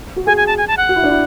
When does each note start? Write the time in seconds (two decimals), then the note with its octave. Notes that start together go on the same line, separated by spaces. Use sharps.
0.16 F#4
0.26 G#4 G#5
0.37 G#5
0.47 A5
0.58 G#5
0.68 A5
0.77 F#5
0.89 F#4
0.96 E4
1.03 D4
1.10 E4